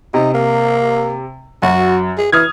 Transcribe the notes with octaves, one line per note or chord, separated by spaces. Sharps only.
C3 D#4
A#3
F#2 F#4
G#4
E3 D#6 F6 G#6